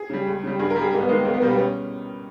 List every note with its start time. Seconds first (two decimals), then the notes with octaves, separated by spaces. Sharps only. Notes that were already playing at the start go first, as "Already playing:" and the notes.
Already playing: G#4
0.10 C#3 G3
0.27 C#2
0.44 C#3 G3
0.59 G2 G#4
0.70 A#4
0.76 G3
0.81 G#4
0.93 G#2 A#3
1.01 B3
1.08 D#3 G#3 A#3
1.25 C#2 A#3
1.34 B3
1.42 B2 G3 A#3
1.51 B3
1.58 C#4